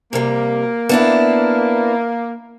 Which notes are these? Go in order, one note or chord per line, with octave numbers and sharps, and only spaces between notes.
C3 G3 A#3
B3 D4 E4